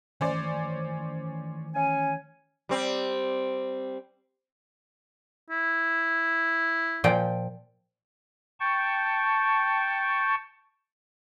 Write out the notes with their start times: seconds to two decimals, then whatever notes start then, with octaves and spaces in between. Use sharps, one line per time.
0.21 D#3 E3 A3 C#4 C5 D5
1.75 C#4 G#5
2.69 G3 C4
5.51 E4
7.04 A#2 F3 G5
8.60 G5 A5 C#6